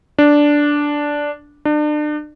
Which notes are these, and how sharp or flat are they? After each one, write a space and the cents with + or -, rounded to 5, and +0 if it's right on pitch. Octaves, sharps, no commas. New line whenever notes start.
D4 -5
D4 +35